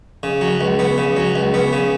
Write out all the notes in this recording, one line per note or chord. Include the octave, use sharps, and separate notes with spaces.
C#3
F#3
C#2
B3
C#3
F#3
C#2
B3
C#3